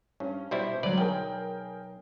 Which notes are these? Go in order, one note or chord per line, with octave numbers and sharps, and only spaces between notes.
G2 C#4
B2 G3 E4 C5
D2 F#3 B4 D5
B1 G#4 A#4 G5